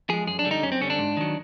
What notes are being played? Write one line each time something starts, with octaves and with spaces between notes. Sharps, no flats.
F3 G#3 G#4
F#2 G#4
D4
D3 G3
D#4
F#2 C#4
C4
D3 G3 C#4
D4
G#2
D#3 F#3